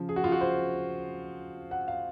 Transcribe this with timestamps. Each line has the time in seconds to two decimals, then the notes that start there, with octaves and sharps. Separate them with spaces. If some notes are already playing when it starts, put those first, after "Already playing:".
Already playing: C#3 F3
0.09 G#4
0.16 F#4
0.24 F4
0.32 F#4
0.41 C5
1.71 F#5
1.88 F5